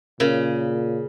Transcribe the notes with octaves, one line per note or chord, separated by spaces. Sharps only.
A#2 C#3 A#4 C#5